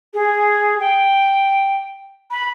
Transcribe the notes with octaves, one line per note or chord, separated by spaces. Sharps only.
G#4
G5
B5